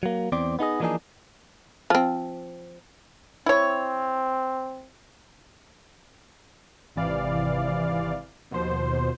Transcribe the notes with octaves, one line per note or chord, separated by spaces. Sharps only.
F#3 A#3
E2 C4 C5 D5
B3 D#4 G#4 D#5
E3 F3 A#3 D4 D#4 G#4
F3 C4
C4 E4 C#5
G#1 C3 E3 D5 F5
D#2 B2 F3 C5